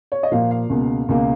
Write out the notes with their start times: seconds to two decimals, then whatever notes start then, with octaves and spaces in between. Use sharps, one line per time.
0.12 C#5
0.23 D#5
0.32 A#2 F3 A#3 F5
0.51 F5
0.69 C#2 B2 A#3
1.09 C#2 B2 A#3